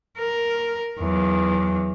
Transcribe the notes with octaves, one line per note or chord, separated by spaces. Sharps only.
A#4
E2 F#3